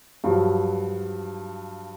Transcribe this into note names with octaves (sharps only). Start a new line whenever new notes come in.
G2 F3 F#3